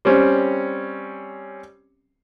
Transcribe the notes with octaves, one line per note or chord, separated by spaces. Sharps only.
G3 C4 C#4